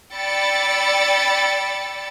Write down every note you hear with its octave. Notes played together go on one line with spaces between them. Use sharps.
D5 G5 B5 E6 A6 C#7